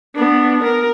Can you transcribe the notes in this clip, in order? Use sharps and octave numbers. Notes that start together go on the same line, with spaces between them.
B3 D4
A#4